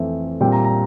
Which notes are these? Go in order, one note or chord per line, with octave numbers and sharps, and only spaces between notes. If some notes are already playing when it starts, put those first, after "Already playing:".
Already playing: F2 E3 A3 C4
A#2 G3 C4 G5
A#5
A#5